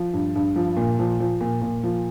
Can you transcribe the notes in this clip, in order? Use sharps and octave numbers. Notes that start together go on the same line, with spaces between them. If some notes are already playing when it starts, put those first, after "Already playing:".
Already playing: F3
G2
G2
F3
A#2
F3
F3
A#2
A#2
F3